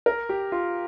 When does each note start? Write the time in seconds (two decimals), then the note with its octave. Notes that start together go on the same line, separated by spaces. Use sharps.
0.06 A#4
0.29 G4
0.52 F4